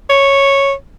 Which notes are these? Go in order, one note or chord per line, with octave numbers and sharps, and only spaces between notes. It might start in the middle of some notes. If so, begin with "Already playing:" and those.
C#5